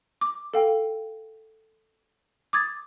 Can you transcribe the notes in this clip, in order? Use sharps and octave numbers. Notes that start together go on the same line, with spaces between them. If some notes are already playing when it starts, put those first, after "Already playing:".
D6
A4 F5 G5
D6 D#6 G#6 A6